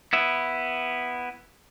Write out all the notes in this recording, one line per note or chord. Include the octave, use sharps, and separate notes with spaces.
B3 E4